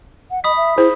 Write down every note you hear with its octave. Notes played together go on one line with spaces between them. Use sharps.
F#5
D#5 B5 D#6 B6
E5
E4 G#4 C5